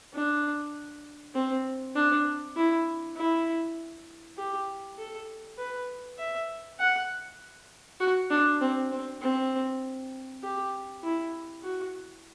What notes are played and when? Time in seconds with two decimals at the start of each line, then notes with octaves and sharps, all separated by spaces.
0.13 D4
1.34 C4
1.95 D4
2.56 E4
3.16 E4
4.37 G4
4.98 A4
5.58 B4
6.18 E5
6.79 F#5
8.00 F#4
8.30 D4
8.61 C4
8.91 C4
9.21 C4
10.42 G4
11.03 E4
11.63 F#4